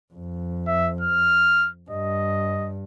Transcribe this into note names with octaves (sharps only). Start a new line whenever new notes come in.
F2
E5
F6
G2 D#5